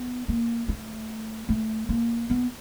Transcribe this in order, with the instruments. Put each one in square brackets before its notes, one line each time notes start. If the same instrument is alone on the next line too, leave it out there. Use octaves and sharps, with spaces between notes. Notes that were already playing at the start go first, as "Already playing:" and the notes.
Already playing: [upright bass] B3
A#3
A3
A3
A#3
B3